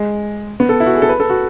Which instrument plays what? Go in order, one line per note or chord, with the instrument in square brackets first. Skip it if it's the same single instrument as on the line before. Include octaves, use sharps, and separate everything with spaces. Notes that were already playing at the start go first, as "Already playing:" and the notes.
Already playing: [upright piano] G#3
B3
A4
E4
F#4
G#4
A4
B4
A4
F#4